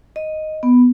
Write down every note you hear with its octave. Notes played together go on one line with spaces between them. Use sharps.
D#5
B3